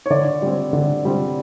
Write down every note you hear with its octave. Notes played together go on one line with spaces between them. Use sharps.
C#5
D3 D5
G3 C4
D3
G3 C4